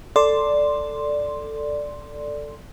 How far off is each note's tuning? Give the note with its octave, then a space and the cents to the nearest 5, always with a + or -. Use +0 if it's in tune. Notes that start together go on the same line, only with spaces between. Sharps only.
A4 +10 D5 +0 C6 +0